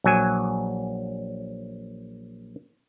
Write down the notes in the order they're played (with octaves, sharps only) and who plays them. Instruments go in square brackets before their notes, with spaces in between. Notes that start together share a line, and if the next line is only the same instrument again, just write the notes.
[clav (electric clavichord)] A#1 F#3 G#5